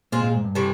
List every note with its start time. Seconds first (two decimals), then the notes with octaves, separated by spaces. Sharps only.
0.12 A#2 G#3 C4 F4
0.24 A#2
0.34 G#2
0.44 G2
0.55 C3 E3 A3